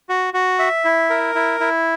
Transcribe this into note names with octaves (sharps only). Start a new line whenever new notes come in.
F#4
F#4
E5
E4
A#4
E4
E4